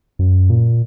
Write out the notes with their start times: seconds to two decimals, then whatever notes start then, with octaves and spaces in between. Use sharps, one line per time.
0.19 F#2
0.50 A#2